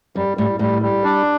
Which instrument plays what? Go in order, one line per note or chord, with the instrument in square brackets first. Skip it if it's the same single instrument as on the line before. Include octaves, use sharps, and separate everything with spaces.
[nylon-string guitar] F#2 [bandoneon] G3
[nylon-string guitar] A2 [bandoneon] G3
[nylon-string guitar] A2 [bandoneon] G3
[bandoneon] G3
D4